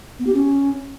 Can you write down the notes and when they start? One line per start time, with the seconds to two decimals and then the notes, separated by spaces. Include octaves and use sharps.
0.19 B3
0.27 G4
0.34 C#4